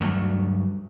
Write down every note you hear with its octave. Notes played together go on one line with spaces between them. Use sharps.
D2 G2 F#3 A3